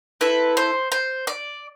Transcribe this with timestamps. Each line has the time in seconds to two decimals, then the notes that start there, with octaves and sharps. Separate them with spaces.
0.21 C4 E4 A4 B4
0.57 C5
0.92 C5
1.27 D5